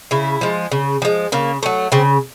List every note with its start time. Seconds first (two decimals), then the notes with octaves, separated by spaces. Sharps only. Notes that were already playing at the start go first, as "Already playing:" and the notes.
0.11 C#3 E4
0.41 F3 G#3
0.72 C#3
1.02 F3 G#3
1.32 C#3 A#3
1.63 F#3 A3
1.92 C#3 C4